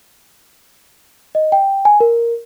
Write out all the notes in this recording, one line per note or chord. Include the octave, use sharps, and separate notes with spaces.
D#5
G5
G#5
A#4